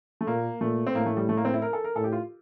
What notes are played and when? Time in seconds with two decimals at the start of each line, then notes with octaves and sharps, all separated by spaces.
0.21 A3
0.27 A#2 A#3
0.61 A#2 A3
0.87 C4
0.95 A2 A#3
1.06 A3
1.17 G3
1.29 A3
1.37 A#3
1.45 C4
1.54 E4
1.62 A#4
1.73 A4
1.84 A#4
1.96 A2 A4
2.04 G4
2.12 F4